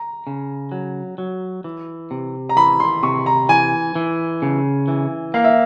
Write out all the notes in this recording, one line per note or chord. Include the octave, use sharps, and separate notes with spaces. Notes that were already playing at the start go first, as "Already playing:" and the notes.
Already playing: A#5
C#3
F#3
F#3
E3
C3
A#5
E3 B5
C6
C3 C#6
A#5
E3 G#5
E3
C#3
E3
A#3 F5
E5